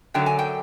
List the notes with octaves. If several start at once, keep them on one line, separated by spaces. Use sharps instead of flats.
F#2 D3 F#3 G5
G#5
G5